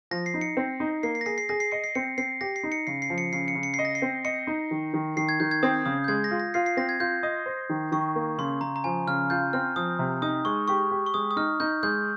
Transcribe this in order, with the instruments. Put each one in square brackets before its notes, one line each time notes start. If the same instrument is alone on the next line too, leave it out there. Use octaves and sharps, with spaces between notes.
[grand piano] F3 [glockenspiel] A#6
[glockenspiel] C7
[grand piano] D#4
[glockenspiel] C#7
[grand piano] C4
D#4
[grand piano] A#3 [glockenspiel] C7
[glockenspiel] C7
A#6
[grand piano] G#4 [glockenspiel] C7
[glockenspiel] C7
[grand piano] G#4 [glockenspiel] A#6
[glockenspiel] C7
[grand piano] D#5 [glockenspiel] C#7
[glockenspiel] C7
[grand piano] C4 [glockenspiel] C#7
[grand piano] C4 [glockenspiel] C7
[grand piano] G4 [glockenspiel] A#6
[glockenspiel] C7
[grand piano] D#4
[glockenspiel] C#7
[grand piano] C#3 [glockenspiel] C7
[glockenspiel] C7
[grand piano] F3
[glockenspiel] C#7
[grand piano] C#3 [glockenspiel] C7
[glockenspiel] C#7
[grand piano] C#3
[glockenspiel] C#7
[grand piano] D#5 [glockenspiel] C7
[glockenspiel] A#6
C7
[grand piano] C4
[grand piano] D#5 [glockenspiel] C#7
[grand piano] D#4
D#3
D#3
[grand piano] D#3 [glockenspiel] C7
[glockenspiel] G#6
[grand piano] D#3 [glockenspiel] G6
[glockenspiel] G#6
[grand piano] C4 [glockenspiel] D#6
[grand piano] C#3 [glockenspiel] D#6
[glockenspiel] G6
[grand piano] G#3 [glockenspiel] G#6
[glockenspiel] A#6
[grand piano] F4
[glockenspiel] A#6
[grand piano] F4 [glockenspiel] C7
[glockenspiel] C7
[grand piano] C4 [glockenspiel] A#6
[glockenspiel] G#6
[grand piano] F4 [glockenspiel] G6
[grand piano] D#5 [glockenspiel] D#6
[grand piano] C5
D#3
[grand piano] D#3 [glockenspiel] C#6
[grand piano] A#3
[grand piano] C#3 [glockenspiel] C6
[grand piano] C#3 [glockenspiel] A#5
[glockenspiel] A#5
[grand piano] F3 [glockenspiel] G#5
[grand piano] C#3 [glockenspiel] F6
[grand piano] F4 [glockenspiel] G6
[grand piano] C4 [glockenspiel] F6
[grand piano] F3 [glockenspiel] D#6
[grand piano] C3
[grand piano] D#4 [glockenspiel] D#6
[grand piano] G#3 [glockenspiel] C#6
[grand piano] G4 [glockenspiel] C#6
[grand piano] G4
[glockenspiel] C#6
[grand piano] G#3 [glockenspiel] D#6
[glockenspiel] D#6
[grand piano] D#4 [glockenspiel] F6
[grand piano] D#4 [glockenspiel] G6
[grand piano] G#3 [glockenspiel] G6